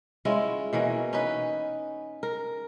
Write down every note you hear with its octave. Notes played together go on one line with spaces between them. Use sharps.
G#3 C#4 E4 F4
B2 E3 A#3 C#4
C#4 D#4 B4
A#4